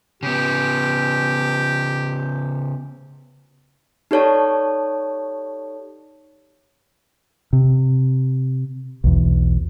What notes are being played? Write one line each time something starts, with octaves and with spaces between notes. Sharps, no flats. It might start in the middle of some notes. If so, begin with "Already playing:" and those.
C#3 B3 G4
D#4 G4 A4 C#5 D5 A5
C3
B1 E2